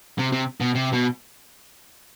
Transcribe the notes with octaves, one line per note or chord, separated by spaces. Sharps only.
C3
C3
B2
C3
B2